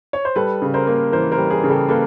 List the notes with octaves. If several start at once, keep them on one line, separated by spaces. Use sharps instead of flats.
C#5
C5
G3 A4 B4
C#3
A#4 C5
A#3
E3 A#4 C5
A#4 C5
G3
G#4
C#3
G4 A4
A#3 A4 B4